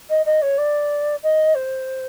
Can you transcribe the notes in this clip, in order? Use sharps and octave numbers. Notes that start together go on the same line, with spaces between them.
D#5
D#5
C#5
D5
D#5
C5